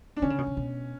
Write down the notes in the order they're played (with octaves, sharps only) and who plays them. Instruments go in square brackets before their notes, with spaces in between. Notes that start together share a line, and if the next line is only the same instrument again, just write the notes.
[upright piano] D4
[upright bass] D3 [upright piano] C#4
[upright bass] C#3
B2
C#3
B2